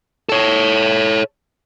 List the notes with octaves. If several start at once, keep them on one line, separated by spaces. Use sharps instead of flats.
A4 C#5